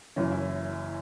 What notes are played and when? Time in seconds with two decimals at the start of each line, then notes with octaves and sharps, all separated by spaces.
0.16 F#1 F#2 E3 C#4
0.32 E4